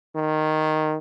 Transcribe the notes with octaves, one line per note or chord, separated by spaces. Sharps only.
D#3